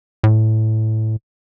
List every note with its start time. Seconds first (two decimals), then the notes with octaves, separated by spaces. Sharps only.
0.24 A2